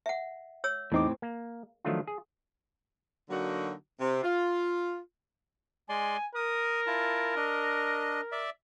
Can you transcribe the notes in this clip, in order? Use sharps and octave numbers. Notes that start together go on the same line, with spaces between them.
E5 F#5
C#5 E6
E2 A2 C4 D#4 D6
A#3
D#3 F3 F#3 A3 D4 F4
G#4
D3 F#3 A#3 D4 D#4 F#4
C3
F4
G#3 D5 G#5 C6
A#4 D#6
E4 F4 A5
D4 D#5
D5 E5